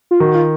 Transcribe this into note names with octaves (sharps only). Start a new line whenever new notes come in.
F4
D#3 F#4
F4